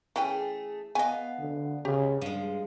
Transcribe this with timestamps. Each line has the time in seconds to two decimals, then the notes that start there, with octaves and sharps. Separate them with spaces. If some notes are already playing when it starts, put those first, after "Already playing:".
0.16 E3 A3 C#4 G#4 G5
0.95 B3 D#5 F5 G#5
1.39 D3
1.85 C#3 G4
2.22 G2 F3 G#3